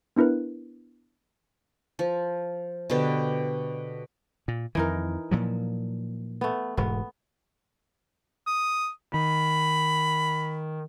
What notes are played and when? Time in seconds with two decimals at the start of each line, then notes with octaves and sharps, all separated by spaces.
0.16 B3 D4 E4 A#4 B4
1.99 F3
2.90 B2 D3 G4
4.48 A#2
4.75 F2 D#3 E3 D#4 A#4
5.31 A#2 F3 F#3
6.41 A3 B3
6.77 E1 G#2 B3
8.47 D#6
9.14 D#3 B5